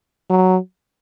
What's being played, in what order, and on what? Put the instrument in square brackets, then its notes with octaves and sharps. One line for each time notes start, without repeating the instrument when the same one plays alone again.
[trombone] F#3